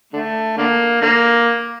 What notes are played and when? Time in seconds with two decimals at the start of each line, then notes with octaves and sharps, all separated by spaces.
0.13 D3 A3
0.57 D3 A#3
1.02 D3 A#3